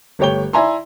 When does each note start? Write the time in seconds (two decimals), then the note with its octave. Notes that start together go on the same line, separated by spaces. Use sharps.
0.19 G1 A3 G4 C#5 G5 G7
0.53 E4 D5 E5 G#5 A#5 C6